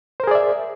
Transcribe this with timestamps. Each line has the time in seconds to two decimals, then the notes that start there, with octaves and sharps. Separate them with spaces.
0.20 C5
0.24 A#4
0.27 G#4
0.31 D5
0.35 E5